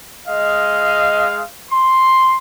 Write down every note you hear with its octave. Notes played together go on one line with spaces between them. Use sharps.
G#3 D#5 F5
C6